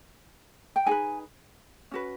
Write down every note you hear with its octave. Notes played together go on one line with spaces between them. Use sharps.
G5
D#4 G#4 B4 G#5
C#4 F#4 B4